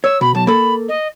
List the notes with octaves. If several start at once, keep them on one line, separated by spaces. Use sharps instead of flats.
C#5 E6
B2 B5
B1 A5
A#3 A4 B5
D#5